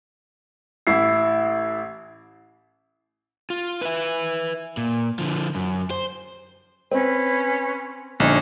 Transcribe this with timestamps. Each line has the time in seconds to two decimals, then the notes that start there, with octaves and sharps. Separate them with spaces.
0.87 A1 E4 C7
3.50 F4
3.81 B4 E5
4.77 A#2
5.19 D3 F3
5.55 F#2
5.91 C5
6.91 C4 C#4 B4
8.20 A#1 D3 C#4 D#4